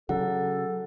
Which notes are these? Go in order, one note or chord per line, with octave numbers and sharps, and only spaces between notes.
C#3 F#3 G#4 A4 F#5